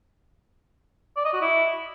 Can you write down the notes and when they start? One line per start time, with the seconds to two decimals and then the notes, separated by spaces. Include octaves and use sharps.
1.17 D5
1.25 D#5
1.33 F#4
1.41 E4